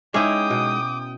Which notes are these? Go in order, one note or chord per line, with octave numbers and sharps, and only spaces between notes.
G#3 C#4 D#4 E4 G5 D6 D#6
B2